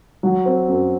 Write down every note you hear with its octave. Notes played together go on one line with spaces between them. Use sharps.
F#3
C4
F#2